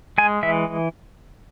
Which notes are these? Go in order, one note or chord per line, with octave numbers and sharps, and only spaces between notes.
G#3 G#5
E3 E5